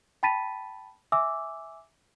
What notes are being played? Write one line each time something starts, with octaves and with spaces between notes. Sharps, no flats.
G5 A5 B5 A6 B6 D#7
E5 G#5 D6 E6